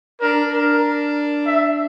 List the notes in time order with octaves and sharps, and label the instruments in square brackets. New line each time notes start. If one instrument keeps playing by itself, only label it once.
[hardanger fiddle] D4 [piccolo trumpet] A#4
[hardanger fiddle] D4 [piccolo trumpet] A#4
[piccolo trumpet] E5